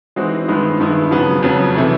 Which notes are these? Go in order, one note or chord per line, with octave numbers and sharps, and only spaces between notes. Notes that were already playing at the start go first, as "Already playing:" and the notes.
E3 G#3 C4 D#4 F#4
G2 D#3 G#3 B3 E4
G2 D#3 G#3 B3 E4
F2 C#3 F#3 B3
F2 C#3 F#3 B3
C3 E3 A3